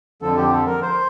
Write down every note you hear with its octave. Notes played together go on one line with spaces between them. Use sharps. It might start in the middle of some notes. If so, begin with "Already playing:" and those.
F2 D3 F3 A4
G4
A4
A#4
C5